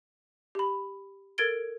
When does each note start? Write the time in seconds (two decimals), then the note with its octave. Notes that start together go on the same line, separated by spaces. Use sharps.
0.55 G4 B5
1.38 A4 A#4 G#6 A6 D7 G7